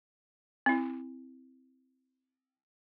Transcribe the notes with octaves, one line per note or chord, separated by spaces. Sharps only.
C4 E4